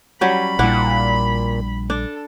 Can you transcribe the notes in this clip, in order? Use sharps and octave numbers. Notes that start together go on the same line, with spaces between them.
F#3 G3 C#4 B5
A#1 A#2 G3 D4 E4 F#5
D4 A4